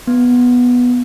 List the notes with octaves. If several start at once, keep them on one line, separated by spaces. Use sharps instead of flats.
B3